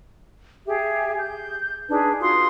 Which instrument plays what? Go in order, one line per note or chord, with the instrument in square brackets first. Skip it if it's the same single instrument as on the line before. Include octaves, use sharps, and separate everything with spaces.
[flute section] G4 G#4 E5
G6
D4 D#4 G#4 B4
F4 F#4 C6 D#6